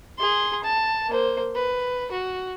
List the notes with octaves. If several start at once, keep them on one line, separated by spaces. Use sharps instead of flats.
G#4 C6
A5
A#3 C5
B4
F#4